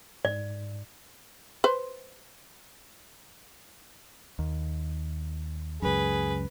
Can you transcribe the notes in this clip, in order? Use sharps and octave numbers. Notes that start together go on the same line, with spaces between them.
G#2 D5
B4 C5
D#2
C#2 F#2 G#4 B4